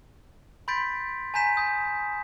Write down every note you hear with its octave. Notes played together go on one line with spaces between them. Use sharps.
B5 C6 G6 A6 B6 D7
G#5 A#5 G6 B6 E7
D#6 G6